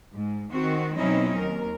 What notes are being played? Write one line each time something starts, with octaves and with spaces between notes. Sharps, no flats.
G#2
D#3 C4 F#4
B2 F#3 C4 C#4 D#4 E4
D#2 A#4